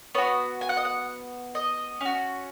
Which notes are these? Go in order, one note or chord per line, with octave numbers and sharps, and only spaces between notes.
B3 F#4 C#5
G#5
F#5
D#5
F#5
D#5
C#4 F#4